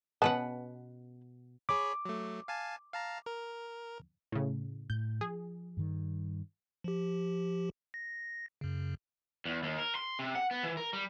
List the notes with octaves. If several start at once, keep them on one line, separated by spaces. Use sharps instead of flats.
B2 B3 C#4 B4 F#5 A5
G#4 C#5 B5 D6
F#3 A3
F5 G#5 A5
F5 A5 A#5
A#4
A2 C#3
A2 G6
F3 G#4
G2 D#3 G3
F3 G4
A#6
F#2 C#3
E2
D#2
A#4
C6
C3
F#5
B3
E3
A#4
G3